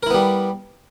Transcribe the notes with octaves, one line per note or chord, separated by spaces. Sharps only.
G3 B3 E4 A#4